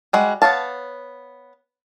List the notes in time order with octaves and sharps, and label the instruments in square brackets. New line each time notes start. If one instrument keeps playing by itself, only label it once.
[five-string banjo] G3 G#3 F#4
B3 C#5 D5 F5 A5